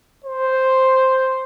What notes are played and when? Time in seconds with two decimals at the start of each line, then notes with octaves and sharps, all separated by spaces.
0.24 C5